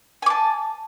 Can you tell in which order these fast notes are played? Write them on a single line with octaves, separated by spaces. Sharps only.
G#5 D6 A5